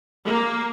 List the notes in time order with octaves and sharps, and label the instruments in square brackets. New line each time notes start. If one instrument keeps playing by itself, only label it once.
[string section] A#3